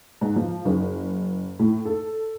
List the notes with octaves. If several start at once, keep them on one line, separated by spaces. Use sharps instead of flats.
G#2
F3
F#1
A2
A4